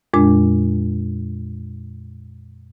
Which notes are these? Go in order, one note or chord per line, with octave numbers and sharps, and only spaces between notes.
F2 A#2 G#3 D4